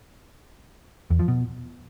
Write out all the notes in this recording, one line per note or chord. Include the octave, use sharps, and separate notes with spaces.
E2
F3
B2